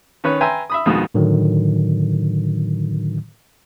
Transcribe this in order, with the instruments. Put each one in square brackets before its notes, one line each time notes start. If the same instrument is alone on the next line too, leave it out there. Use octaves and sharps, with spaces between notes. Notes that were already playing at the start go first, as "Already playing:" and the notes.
[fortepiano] D#3 C#4 B4 C#5 F#6
B4 E5 G5 G#5 A#5 C6
E5 B5 D#6
F2 G#2 B2 D#3
[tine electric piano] A2 D3 D#3 F#3